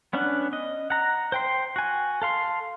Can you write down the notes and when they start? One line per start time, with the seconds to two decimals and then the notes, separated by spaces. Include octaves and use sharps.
0.13 B3 C#4 D4 F#5
0.53 D#5
0.90 F#5 A#5
1.32 C5 G5 C6
1.76 F#4 G#5
2.22 A4 F5 C6